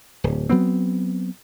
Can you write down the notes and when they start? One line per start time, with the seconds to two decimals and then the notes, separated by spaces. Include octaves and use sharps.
0.24 D1
0.49 F#3 B3 C4